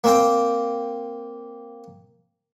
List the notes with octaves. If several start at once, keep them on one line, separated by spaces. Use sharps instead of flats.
A#3 C4 G5